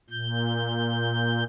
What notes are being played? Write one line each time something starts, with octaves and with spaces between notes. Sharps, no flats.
A#2 G6